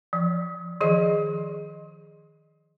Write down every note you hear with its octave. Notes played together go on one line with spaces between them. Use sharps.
F3
D#3 F3 G#4 D#5